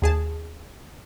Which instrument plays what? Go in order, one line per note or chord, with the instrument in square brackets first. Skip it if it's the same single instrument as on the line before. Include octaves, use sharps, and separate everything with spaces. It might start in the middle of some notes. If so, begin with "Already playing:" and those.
[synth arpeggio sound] D#2 G#4 A5